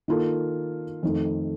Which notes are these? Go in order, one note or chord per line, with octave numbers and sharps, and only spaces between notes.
D#3 A#3 F4 A4
F2 D#3 A3